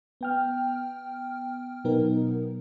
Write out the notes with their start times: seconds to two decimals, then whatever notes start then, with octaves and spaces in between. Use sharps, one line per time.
0.21 B3 G5 F6
1.84 B2 F#3 B3 D#4 A#4